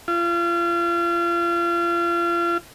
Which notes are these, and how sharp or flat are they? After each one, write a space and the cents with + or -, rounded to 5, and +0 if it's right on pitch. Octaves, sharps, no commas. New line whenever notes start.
F4 -35